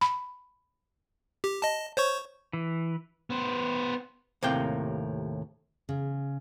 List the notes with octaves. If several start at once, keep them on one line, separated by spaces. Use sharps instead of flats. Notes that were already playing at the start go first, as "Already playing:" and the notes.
B5
G4
D#5 A5
C5 C#5 C#6
E3
B3 C5
D#2 A2 C3 A#3 G5
C#3